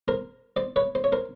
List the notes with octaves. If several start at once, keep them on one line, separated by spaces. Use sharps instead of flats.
A#4 C5
C5 D5
B4 C#5
C5
C#5
A#4 C5